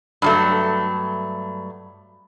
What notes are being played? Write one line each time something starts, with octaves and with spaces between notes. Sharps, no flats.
G2 F#3 A3